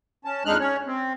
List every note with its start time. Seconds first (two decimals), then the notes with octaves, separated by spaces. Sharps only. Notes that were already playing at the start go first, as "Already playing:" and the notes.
0.25 C#4 A5
0.45 F2 G#3 D4 D#4 F6 F#6
0.60 C#4 C#5
0.86 C4